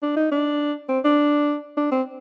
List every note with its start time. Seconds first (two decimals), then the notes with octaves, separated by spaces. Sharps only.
0.02 D4
0.17 D#4
0.32 D4
0.89 C4
1.05 D4
1.77 D4
1.92 C4